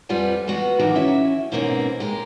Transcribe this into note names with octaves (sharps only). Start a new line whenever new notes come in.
F2 G3 F4 B4 F#5 G#5
E3 G#3 B3 F#4
A2 D#3 E3 F#3 F#4 G4
C#4 E4 E5
G#2 B2 E3 A#3 C4 C#4
G#3 G4 A#4